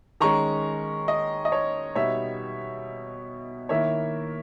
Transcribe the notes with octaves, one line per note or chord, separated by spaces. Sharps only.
D#3 G#3 C#4 A#5 C#6
D#5
D#5
C#5
B2 G3 B3 D#4 C#5 E5
D#3 A#3 E4 C#5 E5